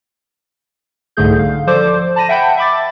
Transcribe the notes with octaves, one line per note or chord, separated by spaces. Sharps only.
C2 G#2 D3 A3 G#4 G6
D3 F5
F3 A4 C5 D5 D6
A5 B5 A#6 D#7
E5 F#5 G5 A5 B5 G6
E5 B5 D6 A6